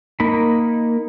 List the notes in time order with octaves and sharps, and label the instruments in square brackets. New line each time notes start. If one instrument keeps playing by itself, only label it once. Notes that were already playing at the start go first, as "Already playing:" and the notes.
[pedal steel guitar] A#3 D#4 B5